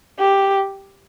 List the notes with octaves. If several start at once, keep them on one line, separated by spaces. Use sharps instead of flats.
G4